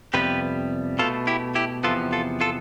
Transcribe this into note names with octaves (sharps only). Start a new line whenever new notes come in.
F2 C3 G3 B3 G4 B4
B2 A3 F4 A4
E4 G4
E4 G4
E2 C3 F3 B3 F4 A4
F4 A4
F4 A4